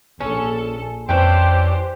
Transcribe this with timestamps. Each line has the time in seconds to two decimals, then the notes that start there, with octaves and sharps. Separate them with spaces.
0.21 A#1 C#4 A4
1.09 F2 E3 C#4 D4 G4 C5 G5